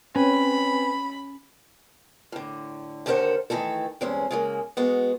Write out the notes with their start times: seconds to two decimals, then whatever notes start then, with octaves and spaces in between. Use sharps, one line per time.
0.16 C4 C#4 B4 G#5 B5
2.32 A2 D3
3.06 D#2 D3 A4 A#4 C5 F#5
3.50 D#3 E3 A3 A4
4.01 E2 G2 G#3 C4 C#4
4.31 C#3 G#3 A#3
4.77 G#3 B3 F#4